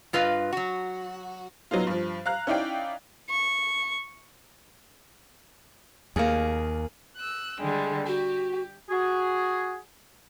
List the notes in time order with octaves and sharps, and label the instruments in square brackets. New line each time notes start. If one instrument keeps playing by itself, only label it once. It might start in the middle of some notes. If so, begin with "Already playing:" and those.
[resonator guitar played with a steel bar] G2 F4 B4 D#5 F5
F#3 F#4
[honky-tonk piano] F#3 B3 D#4 F4
G2 F3
F5 A#5 F#6
C#4 D#4 E4 D5 F5 G5
[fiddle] C#6
[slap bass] D#2 [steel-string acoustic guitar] A#3 G#4
[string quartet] E6 F#6
D3 G3 G#3
[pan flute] F#4 [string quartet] G4
[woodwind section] F#4 G#4